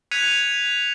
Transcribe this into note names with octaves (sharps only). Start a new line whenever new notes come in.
F#6 G#6 B6 C#7 D#7 F7